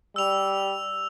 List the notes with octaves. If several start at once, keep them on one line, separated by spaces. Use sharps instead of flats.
G3 E6 F7